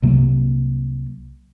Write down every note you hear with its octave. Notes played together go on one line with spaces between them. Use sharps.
C2 C3 F#3 A#3